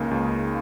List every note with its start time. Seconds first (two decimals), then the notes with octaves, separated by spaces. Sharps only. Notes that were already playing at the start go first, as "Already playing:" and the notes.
Already playing: C#2 C#3 A#3 D#4
0.11 C#2